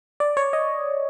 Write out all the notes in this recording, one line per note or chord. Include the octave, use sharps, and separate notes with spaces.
D5
C#5
D#5